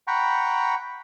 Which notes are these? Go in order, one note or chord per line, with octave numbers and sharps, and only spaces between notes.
F#5 G5 A#5 B5 C#6